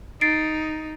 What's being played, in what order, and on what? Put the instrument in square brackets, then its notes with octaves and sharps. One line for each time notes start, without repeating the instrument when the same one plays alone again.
[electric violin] D#4 [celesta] A6 C7 D7